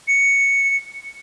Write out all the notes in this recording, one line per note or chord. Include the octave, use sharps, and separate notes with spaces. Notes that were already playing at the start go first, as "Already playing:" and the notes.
C#7